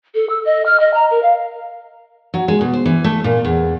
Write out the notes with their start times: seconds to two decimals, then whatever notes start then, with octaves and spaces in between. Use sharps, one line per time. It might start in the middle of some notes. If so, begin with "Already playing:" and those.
0.14 A4
0.29 E6
0.45 D#5
0.65 F6
0.80 D#5
0.94 A#5
1.10 A#4
1.22 F5
2.34 F#3
2.48 G#3
2.61 B2
2.73 C5
2.86 E3
3.04 A3
3.24 A#2
3.45 E2